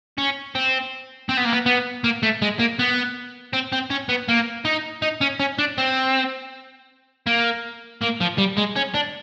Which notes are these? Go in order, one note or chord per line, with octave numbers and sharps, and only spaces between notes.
C#4
C4
C4
B3
A#3
B3
B3
A#3
A3
G#3
A#3
B3
C4
C4
C#4
B3
A#3
D#4
D#4
C#4
C#4
D4
C4
A#3
A#3
F3
G3
G#3
C#4
D4